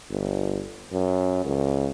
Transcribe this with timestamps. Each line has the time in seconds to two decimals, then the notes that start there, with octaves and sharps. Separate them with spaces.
0.10 G1
0.93 F#2
1.45 C#2